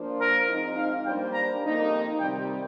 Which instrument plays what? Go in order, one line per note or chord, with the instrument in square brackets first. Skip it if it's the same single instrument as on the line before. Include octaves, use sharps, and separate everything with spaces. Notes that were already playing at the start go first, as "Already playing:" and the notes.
Already playing: [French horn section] F3 A#3 D4 F4 C5
[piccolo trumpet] A#4
[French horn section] G#2 F3 C4 D#4
[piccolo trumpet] F5
[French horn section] G3 A#3 D4 G4 C5 [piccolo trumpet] G5
[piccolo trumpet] A#5
[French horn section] F2 D#3 A#3 D#4 G4 [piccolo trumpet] A#5
[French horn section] C3 D#3 G3 [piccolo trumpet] G5